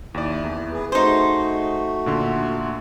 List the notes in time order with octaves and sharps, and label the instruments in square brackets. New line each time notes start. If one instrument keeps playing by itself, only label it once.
[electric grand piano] D#2 D5 [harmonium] E4
[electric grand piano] E2
[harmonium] G#4 B4
[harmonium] A3 F#4 [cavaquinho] D#4 C5 [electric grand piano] G#4
[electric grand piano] A#2 D3 C6